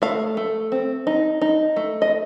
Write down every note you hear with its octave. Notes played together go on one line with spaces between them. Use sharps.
A3 F5
A3
C4
D#4
D#4
A3
D#5